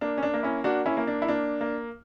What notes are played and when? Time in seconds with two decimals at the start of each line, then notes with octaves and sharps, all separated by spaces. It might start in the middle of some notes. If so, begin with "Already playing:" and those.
0.01 A#3 D4
0.18 C#4
0.23 D4
0.34 A#3
0.43 C#4 E4
0.64 A#3 D4 F#4
0.86 C#4 E4
0.97 A#3
1.07 D4
1.22 E4
1.28 A#3 D4
1.61 A#3